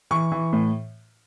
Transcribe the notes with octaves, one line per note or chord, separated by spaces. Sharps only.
E3 C#6
E3
A2